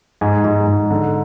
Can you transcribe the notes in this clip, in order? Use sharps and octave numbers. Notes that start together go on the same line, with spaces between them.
G#2 G#5
G#2
G#2
D3